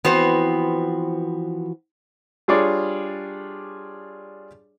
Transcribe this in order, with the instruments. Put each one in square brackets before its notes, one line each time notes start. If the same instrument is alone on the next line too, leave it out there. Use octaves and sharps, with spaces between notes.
[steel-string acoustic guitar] E3 F3 F#4 [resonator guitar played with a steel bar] B3 C4 C5
[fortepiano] G3 D4 F4 G#4 C#5 D5